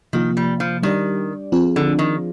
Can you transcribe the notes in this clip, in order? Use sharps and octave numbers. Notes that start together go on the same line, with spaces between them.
C3 D#3 F3 A#3 F4
G3
F3
D#3 G3 D4 G4 D5
F3 C4 F4 G#4
D3
D#3